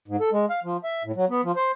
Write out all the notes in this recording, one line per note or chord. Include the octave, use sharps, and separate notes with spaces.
G#2
A4
G#3
F5
F3
E5
A2
F#3
B3
F3
C5